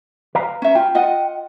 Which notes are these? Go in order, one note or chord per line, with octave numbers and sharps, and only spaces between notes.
B4 F5 A#5
C#4 E5
F4 G5
F4 D#5 F#5